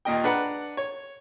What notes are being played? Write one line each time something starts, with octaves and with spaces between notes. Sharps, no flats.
D#2 A#2 D#5 G5
D4 B4 F#5 A#5
C#5